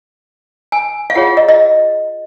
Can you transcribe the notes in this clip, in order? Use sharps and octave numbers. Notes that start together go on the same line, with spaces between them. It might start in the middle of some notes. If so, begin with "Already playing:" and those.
G#5
F5
F4 G#4 C#5 F#5
D#5
D#5